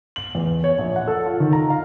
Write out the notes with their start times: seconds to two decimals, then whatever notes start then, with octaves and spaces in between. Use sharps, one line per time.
0.16 F#7
0.35 E2
0.64 C#5
0.79 A#1
0.96 F#5
1.07 A4
1.26 F4
1.40 D#3
1.53 A#5
1.70 F5